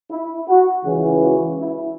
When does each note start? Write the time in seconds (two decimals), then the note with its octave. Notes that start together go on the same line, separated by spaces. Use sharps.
0.11 E4
0.49 F#4
0.85 C#2 C#3 E3
1.22 F#4
1.60 E4